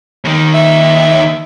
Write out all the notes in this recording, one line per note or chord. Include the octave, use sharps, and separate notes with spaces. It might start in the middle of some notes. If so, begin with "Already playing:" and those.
D#2 D#3
E5